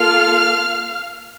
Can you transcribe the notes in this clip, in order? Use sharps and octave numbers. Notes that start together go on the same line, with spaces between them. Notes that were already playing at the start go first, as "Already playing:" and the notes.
Already playing: A#3 F4 A4 F5 F6